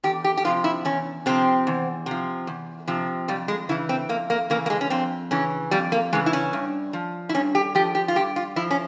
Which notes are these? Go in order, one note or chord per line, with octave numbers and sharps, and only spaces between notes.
E2 G4
G4
G4
C3 F3 F4
E4
E2 C#4
C3 F3 C4
E2
C3 F3
E2
C3 F3
F2 G3
G#3
C#3 E3 E4
C4
F2 A#3
A#3
C#3 E3 A#3
A#3
G#3
C#4
F2 C4
C#3 E3 C#4
F2 G3
A#3
C#3 E3 G#3
E4
C#4
G2
F3
E4
G2 C#4
G4
F3 G4
G4
F4
G2 G4
F4
F3 E4
C#4